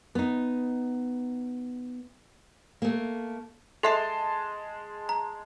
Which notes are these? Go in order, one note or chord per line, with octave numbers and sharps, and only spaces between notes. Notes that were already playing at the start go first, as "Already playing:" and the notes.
B3 D#4
A3 A#3
G#3 A4 E5 A5 C6 C7
A#5